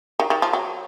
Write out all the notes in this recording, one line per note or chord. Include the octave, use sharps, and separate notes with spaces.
D#3
D#3
F3
F#3